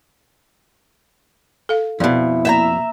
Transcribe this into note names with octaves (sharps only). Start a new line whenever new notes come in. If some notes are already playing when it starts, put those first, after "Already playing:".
A4 F5
F2 B2 E4 D5
A#3 E5 G5 A#5